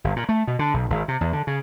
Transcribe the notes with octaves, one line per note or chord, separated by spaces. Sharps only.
G1
A#2
A3
B2
D3
B1
G#1
C3
E2
D3
C#3